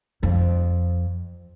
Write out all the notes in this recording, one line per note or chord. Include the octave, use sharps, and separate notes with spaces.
F2